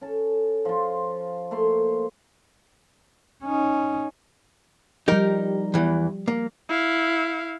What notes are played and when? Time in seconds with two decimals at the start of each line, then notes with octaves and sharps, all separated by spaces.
0.01 C#4 A4
0.65 F3 F4
1.51 A3 A#3 C5 C6
3.43 C#4 D#4
5.08 F3 G3 D#4 G4 A#4
5.74 E2 E3
6.28 A#3
6.69 E4 F5